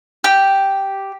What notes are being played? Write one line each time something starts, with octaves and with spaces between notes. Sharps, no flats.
G4